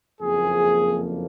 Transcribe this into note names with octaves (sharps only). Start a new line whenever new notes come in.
F#1 F2 F3 A#3 G#4